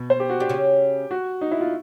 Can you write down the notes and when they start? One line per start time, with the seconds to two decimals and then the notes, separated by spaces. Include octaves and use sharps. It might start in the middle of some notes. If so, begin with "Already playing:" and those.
Already playing: B2 B3
0.10 C5
0.20 G4
0.30 F#4
0.40 D4 G4
0.49 C#3 C#4
1.11 F#4
1.41 D#4
1.51 E4
1.61 F4